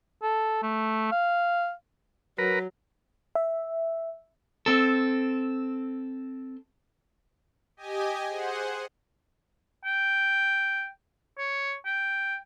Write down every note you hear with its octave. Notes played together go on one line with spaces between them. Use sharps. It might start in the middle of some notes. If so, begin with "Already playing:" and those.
A4
A3
F5
F#3 A#4 B4
E5
C4 A4
G4 D#5 G#5
G#4 C5 F#5
G5
C#5
G5